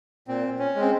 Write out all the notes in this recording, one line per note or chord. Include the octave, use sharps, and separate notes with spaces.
A#2 C4
C#4
G#3 C4